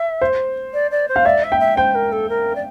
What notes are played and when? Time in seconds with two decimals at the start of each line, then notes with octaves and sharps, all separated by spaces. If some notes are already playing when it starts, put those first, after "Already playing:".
Already playing: E5
0.22 C5
0.73 D5
0.91 D5
1.08 C5
1.16 F5
1.25 D5 E5
1.43 E5
1.52 G5
1.60 E5
1.77 C5 G5
1.94 A#4
2.12 A4
2.29 A#4
2.55 D5